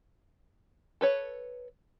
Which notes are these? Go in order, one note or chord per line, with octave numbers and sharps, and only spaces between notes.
A4 B4 C#5